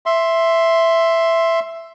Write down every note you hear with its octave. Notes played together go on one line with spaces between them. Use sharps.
E5 C6